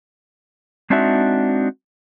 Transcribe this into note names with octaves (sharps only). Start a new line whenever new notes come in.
G#3 C4 D4 D#4 F#4 E5